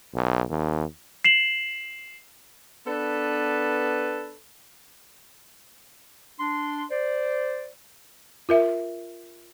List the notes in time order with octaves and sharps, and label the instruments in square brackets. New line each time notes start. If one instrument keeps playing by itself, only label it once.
[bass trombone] B1
D#2
[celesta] C7 E7 F#7
[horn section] B3 D4 A4 B4
[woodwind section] D4 C6
C5 D5
[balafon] F4 A#4 E5